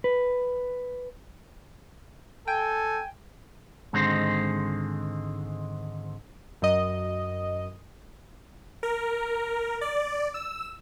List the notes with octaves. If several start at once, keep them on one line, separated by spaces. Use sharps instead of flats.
B4
A4 G5 G#5
G#2 D3 D#3 G#3 C4 C5
F#2 D#5
A#4
D5
E6